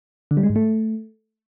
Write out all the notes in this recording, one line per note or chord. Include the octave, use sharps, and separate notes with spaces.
D3
G3
G#3
G#2
A3